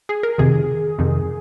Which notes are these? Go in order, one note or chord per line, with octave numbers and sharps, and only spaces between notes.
G#4
A#4
F2 C3 D#3 G#4
F2 C3 D#3